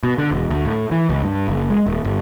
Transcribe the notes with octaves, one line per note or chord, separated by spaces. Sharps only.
B2
D3
E1
D2
A2
E3
C#2
G2
F#1
G#3
D#1
G1